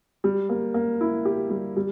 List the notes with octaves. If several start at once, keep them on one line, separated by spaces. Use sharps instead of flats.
G3
A#3
A#3
E4
G4
G3
G3